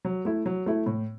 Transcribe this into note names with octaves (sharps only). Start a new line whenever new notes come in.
F#3
A3 E4
F#3
A3 E4
A2